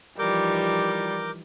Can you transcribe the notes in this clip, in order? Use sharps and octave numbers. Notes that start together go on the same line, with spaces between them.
E3 F3 G3 D#4 A#4 D6 G6